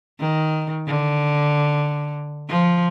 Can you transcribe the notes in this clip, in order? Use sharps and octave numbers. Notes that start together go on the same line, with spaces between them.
D#3
D3
F3